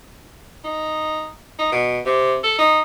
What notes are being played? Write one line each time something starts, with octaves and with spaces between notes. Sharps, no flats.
D#4
D#4
B2
C3
A4
D#4